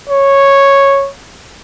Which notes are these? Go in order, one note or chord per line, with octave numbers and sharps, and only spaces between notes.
C#5